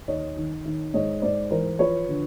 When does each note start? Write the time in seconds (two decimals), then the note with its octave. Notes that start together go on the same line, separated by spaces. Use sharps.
0.08 D#2 C#5 D#5
0.36 D#3
0.65 D#3
0.94 G#2 C#5 D#5
1.22 G#2 C5 D5
1.51 E3 A#4 C5
1.79 F3 B4 C#5
2.08 D3